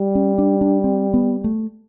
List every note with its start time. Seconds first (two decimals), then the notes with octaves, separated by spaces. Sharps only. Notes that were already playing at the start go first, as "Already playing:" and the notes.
Already playing: G3
0.15 C#4
0.38 D4
0.61 D4
0.84 C4
1.14 B3
1.44 A3